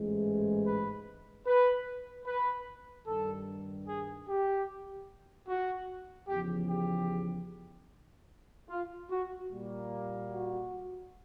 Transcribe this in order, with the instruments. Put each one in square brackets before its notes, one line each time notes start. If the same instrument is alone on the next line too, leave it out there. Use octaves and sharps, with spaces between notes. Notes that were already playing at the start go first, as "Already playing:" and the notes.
Already playing: [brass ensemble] A1 G#2 E3 G#3
B4
B4
B4
G2 D#3 G3 A4
G#4
G4
F#4
E2 C#3 F3 G4
G4
F4
F#4
A#2 G3 A#3
F#4